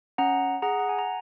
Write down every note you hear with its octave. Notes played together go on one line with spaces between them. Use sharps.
C#4 F#5 A#5
G#4 F#5 A#5
F#5
G#5
A#5